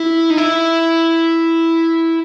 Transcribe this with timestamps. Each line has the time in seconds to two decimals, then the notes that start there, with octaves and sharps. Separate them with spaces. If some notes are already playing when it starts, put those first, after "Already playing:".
Already playing: E4
0.30 D#4
0.38 E4